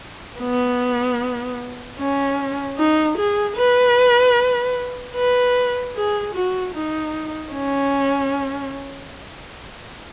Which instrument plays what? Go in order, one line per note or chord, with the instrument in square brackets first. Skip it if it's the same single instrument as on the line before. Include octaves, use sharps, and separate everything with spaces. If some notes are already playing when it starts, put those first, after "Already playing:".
[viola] B3
C#4
D#4
G#4
B4
B4
G#4
F#4
D#4
C#4